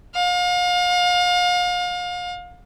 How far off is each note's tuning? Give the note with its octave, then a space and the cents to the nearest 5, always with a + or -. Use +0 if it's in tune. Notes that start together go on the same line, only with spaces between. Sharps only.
F5 +35